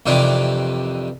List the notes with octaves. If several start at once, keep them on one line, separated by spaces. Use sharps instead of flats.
F2 C3 D#3 E3 D4